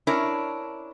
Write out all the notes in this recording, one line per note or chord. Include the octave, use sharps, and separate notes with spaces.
C#4 D4 E4 A#4 C#5